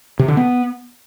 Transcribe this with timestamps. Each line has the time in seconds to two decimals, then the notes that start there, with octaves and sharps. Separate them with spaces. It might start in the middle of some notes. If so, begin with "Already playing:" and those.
0.19 C3
0.28 D3
0.37 B3